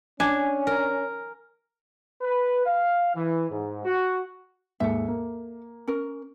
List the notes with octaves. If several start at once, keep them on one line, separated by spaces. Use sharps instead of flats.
C#4 D4 G#5
A#4
B4
F5
E3
G#2
F#4
D#2 G#2 A4 E5
A#3
C#4 A#4